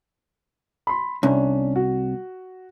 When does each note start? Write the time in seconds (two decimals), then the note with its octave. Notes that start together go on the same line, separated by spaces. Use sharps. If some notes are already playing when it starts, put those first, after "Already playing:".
0.87 B5 C6
1.23 C2 C#4 D4
1.76 F#4